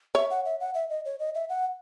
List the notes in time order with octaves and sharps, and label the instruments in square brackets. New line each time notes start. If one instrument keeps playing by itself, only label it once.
[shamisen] C#5 [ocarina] E5
[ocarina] F#5
E5
F#5
E5
D#5
C#5
D#5
E5
F#5